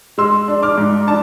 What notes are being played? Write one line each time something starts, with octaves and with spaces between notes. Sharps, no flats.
G#3 C6 E6
D4
D6 F6
G#2
D4 A5